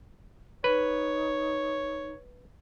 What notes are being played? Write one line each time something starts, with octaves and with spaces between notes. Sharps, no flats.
D#4 B4 C#5